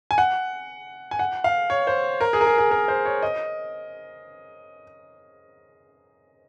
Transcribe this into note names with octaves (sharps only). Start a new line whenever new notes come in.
G#5
F#5
G#5
F#5
F5
C#5
C5
A#4
G#4
A#4
G#4
G#4
A#4
C5
C#5
D#5